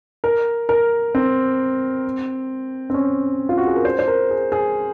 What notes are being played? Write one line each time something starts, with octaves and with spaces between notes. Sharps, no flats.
A#4
A#4
C4
C4
C#4
F4
F#4
G#4
A#4
C5
C5
A#4
G#4
G#4